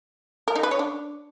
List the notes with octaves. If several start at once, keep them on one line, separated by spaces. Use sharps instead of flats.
A#4
D#4
B4
C#5
D4